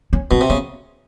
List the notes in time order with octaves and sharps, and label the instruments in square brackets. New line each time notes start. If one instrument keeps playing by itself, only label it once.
[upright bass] C#4
[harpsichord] B2 [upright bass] C4
[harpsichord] C3
[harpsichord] C#3 [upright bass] B3